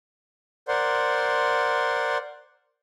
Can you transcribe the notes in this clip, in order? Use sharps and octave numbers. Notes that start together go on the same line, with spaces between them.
A#4 C5 D5 F#5 C6